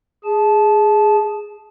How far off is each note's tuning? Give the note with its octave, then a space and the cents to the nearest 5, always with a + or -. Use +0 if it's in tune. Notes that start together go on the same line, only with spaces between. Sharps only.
G#4 +0 A5 -20